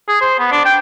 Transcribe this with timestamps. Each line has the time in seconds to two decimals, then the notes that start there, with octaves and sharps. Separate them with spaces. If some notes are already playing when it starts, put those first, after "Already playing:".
0.08 G#4
0.21 C5
0.39 B3
0.52 D4
0.65 G5